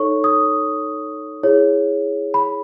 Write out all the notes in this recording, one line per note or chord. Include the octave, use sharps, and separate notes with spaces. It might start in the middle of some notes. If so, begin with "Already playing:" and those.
Already playing: D#4 A4 C#5 C#6
D#6
E4 G#4 C#5
B5